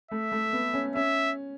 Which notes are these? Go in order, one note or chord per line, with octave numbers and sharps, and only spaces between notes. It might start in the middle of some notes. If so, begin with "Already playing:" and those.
A3 E5
A3
B3
C#4
C#4 E5